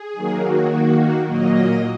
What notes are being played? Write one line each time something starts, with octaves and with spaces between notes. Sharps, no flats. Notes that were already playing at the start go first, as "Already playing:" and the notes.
Already playing: G#4
D#3 F#3 A#3
F#4
D#3 A#3
A#2 F#3 A#3 D#5